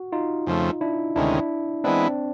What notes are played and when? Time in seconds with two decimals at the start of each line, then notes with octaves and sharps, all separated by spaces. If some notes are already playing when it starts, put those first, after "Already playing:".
Already playing: F#4
0.12 D#4 F4
0.47 F2 C#3 F3 A3
0.81 D4 E4
1.15 D2 C3 D#3 G#3 C#4 D4 E4
1.84 E3 G#3 B3 C4 D4 E4